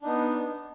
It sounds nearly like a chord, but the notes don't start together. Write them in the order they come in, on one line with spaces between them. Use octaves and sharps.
D4 D#4 B3